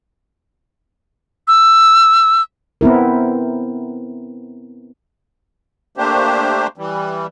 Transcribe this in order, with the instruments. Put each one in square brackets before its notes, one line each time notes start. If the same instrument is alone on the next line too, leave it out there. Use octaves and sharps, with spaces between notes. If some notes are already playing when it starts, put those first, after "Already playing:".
[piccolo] E6
[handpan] B3 C4 E4 A#4
[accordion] A3 A#3 D4 G4 C5
E3 G3